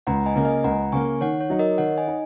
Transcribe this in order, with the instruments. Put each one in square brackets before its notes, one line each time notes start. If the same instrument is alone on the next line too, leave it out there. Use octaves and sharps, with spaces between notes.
[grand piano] C#2 [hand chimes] F#5 A#5
[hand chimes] D#5 G#5
[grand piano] C#3 A#3
[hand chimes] D#5 G#5
[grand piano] C#2 [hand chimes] F#5 A#5
[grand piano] C#3 A#3 [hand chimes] G#5 C#6
[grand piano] D#3 [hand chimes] C#5 F#5
[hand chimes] C#5
[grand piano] F#3 D#4
[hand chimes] A#4 D#5
[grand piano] D#3 [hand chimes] C#5 F#5
[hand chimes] D#5 G#5
[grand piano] D#4